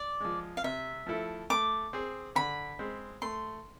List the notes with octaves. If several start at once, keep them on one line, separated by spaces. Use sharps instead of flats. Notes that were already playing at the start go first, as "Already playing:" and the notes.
Already playing: D5
F3 G#3
F5
C3 E5
F3 A3 E4 A4
A3 D6
C4 G#4
D3 B5
G#3 C4
A3 C6